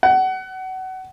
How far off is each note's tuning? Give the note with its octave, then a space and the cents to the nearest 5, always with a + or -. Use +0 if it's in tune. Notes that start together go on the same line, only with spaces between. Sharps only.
F#5 +25